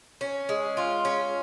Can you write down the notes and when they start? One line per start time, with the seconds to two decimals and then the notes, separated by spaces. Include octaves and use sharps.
0.21 C#4
0.49 G#3
0.77 F4
1.05 C#4